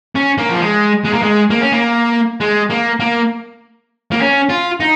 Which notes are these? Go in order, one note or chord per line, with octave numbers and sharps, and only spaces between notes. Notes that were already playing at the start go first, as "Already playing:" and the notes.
C#4
A#3
F3
G#3
G#3
A#3
G#3
A#3
C#4
A#3
G#3
A#3
A#3
A#3
C#4
F4
D#4